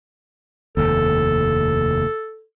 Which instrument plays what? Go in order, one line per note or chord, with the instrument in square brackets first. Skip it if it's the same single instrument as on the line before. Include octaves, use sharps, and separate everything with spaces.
[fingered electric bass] F1 D#2 [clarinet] A4